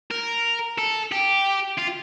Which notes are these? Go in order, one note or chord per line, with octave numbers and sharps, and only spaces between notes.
A#4
A4
G4
F4